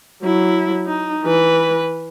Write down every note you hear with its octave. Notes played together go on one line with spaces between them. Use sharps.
F#3 E4
D#4
E3 B4